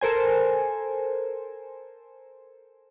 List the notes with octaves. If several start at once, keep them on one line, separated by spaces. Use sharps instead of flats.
A4 A#4 C5 G#5